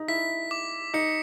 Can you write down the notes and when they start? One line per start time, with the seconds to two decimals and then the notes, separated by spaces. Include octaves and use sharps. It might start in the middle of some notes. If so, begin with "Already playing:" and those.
Already playing: D#4
0.08 E4 B6
0.51 D6
0.94 D#4 C#7